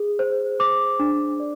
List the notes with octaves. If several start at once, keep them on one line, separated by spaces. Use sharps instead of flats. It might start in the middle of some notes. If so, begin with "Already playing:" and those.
Already playing: G#4
C5
C5 D6
D4
D5